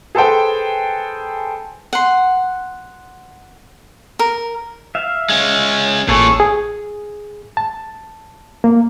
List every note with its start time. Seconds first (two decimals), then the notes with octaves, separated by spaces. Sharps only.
0.15 G#4 A4 B4 C5 G5 G#5
1.93 F#5 C6
4.19 A#4
4.95 E5 F5
5.29 G#3 C#4
6.08 A1 A#2 G#4 A4 C#5
6.40 G#4
7.57 A5
8.64 A#3